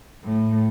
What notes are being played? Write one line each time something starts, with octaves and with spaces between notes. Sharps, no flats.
A2